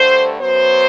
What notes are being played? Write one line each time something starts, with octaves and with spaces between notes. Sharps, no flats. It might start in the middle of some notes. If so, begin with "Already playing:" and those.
Already playing: G2 D3 A3 C5
F#2 F#3 B3 C5